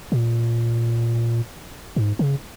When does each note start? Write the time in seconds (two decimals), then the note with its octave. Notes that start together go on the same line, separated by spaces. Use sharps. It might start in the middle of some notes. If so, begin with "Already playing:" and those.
0.12 A#2
1.96 G#2
2.19 C#3